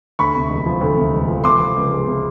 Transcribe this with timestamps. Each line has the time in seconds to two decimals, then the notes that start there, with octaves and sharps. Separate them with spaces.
0.19 D2 B5 C#6
0.35 C3
0.50 E1
0.66 F3
0.81 D2
0.97 C3
1.14 E1
1.28 F3
1.44 C3 C6 D6
1.59 F3
1.76 C#2
1.92 G#3
2.07 C3